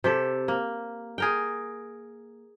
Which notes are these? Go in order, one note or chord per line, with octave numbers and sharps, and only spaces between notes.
C3 G4 A4
A#3
G#4 A#4 G5